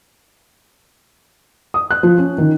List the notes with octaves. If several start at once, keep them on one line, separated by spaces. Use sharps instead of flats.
D#6
F#6
F3
C#4
D#3